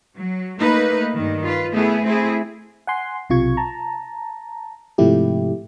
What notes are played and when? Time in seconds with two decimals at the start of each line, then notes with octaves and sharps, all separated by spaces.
0.17 F#3
0.60 A3 A#3 D#4 B4
1.15 G2 D#3
1.43 F4 B4
1.74 A3 B3 E4 G#4
2.04 A3 C4 E4 G#4
2.87 F#5 G#5 C6
3.30 B1 C3 F4 C#6 G#6
3.57 A5 A#5
4.98 G#2 C3 F3 A3 E4 G4